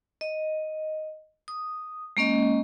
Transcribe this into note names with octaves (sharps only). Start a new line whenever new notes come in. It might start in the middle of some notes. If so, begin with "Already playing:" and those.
D#5
D#6
G#3 A#3 C#4 D#5